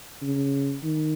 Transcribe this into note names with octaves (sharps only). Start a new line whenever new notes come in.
C#3
D#3